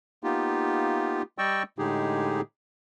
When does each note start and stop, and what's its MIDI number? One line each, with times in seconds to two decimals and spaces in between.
0.24 1.22 58
0.24 1.22 59
0.24 1.22 63
0.24 1.22 65
0.24 1.22 67
1.38 1.63 55
1.38 1.63 74
1.38 1.63 75
1.38 1.63 79
1.38 1.63 85
1.38 1.63 88
1.79 2.41 45
1.79 2.41 50
1.79 2.41 56
1.79 2.41 63
1.79 2.41 67
1.79 2.41 68